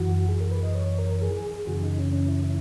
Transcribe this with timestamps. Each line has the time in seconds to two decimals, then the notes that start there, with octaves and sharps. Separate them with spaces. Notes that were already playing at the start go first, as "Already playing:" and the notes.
Already playing: F#2 E3 F#4
0.29 G#4
0.40 A#4
0.51 B4
0.63 D#5
0.74 C#5
0.98 A#4
1.22 G#4
1.67 F#2 C#3 E3 F#4
1.83 D#4
1.98 C#4
2.13 C#4
2.28 E4
2.43 E4